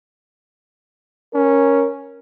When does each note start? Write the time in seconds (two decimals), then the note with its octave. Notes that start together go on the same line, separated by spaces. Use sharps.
1.34 C#4 A#4